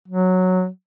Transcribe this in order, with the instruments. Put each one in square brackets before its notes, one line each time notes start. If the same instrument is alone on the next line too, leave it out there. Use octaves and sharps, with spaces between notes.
[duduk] F#3